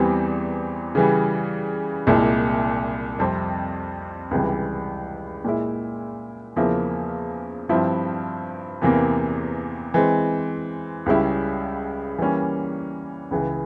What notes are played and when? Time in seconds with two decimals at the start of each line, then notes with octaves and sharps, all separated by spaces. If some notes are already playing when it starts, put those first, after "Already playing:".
Already playing: E2 E3 G3 C4 G4
0.95 C#3 E3 G3
2.07 C2 A#2 G#3 E4
3.19 F2 C3 G3 C4
4.31 C#2 C3 E3 G3
5.45 A#2 G#3 E4
6.56 E2 C#3 F3 A#3 E4
7.69 G2 F3 C4 E4
8.82 E2 C3 E3 A#3
9.94 E3 G#3 C4
11.06 C#2 C#3 G3 C#4 E4
12.18 E3 G3 A#3 C#4
13.31 C#2 C#3 E3